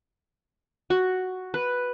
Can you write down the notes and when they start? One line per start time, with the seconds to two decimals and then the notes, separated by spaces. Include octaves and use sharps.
0.90 F#4
1.54 B4